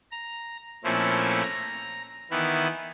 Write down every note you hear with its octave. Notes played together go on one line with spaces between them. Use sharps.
A#5
A#2 F3 A3 C4 C#4 E4
A#5
D#3 E3 B3 E4